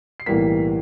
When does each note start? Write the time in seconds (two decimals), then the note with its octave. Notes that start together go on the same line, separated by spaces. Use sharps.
0.20 C7
0.26 B1 A2 E3 G3 A#3 B6